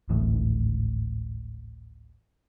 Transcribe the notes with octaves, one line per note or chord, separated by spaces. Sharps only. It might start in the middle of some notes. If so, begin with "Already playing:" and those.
D1 G#1 A2 E3